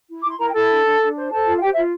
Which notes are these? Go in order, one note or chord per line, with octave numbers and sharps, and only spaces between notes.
E4
E4 D6
C6
E4 A#4 A#5
G5
E4 A4 A5
D4
D4
D4
C5
A4 C5 A5
F4
F5
G4 C5 G5
E5
F4